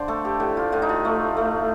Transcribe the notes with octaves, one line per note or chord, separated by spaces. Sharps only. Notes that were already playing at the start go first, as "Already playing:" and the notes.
Already playing: D3 C5 D5 F5
A3 A4
G4
A2 G4
F4
A2 F4
D#4
F4
A3
A3